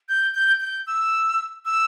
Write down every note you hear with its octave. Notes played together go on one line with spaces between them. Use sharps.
G6
G6
G6
E6
E6